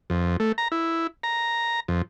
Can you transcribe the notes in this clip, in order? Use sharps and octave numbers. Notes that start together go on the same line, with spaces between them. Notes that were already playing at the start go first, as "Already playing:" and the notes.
F2
A3
A#5
E4
A#5
F2